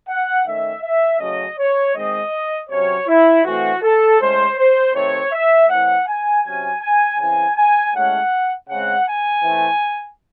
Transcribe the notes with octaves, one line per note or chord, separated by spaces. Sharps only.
F#5
D#3 A3 C#4 E5
E5
C#3 F#3 A3 C#4 D#5
C#5
D#3 G#3 C4 D#5
C3 F#3 C#4 C#5
E4
E3 A3 C4 F#4
A4
A2 G#3 C#4 C5
C5
C3 D#3 A3 C4 C#5
E5
A2 E3 C4 F#5
G#5
C3 F#3 C#4 G#5
G#5
C#3 E3 C4 G#5
G#5
A2 G#3 C#4 F#5
C#3 G#3 C4 F#5
G#5
E3 A3 C4